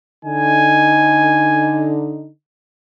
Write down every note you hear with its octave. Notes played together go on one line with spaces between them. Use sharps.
D3 D#4 G#5